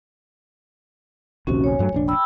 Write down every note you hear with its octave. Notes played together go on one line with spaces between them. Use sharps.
A#1 D#2 C3 C#4 F#4
C#5 G#5
G2 F#3 A3
F1 A#1 D4
G5 B5 E6